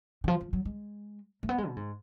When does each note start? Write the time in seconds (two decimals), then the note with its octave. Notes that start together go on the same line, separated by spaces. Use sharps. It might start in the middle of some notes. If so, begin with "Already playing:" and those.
0.24 D3
0.28 F3
0.41 F3
0.53 F#3
0.65 G#3
1.43 A3
1.49 B3
1.58 G#3
1.68 B2
1.77 G#2